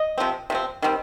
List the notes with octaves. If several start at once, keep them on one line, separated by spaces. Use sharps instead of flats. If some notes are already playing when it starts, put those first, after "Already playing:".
Already playing: D#5
C3 F3 C4
C3 F3 C4
D#3 G3 C4